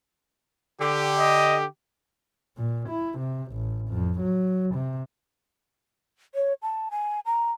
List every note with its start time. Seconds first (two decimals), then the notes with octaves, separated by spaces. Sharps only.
0.80 D3 G4
1.18 D#5
2.57 A#2
2.90 E4
3.19 C3
3.52 A1
3.89 F2
4.21 F#3
4.75 C3
6.35 C#5
6.62 A5
6.91 G#5
7.26 A#5